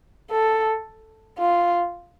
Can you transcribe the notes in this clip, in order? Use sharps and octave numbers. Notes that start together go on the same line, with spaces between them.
A4
F4